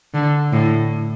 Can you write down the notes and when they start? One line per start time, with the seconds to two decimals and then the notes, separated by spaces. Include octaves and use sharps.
0.14 D3
0.53 A2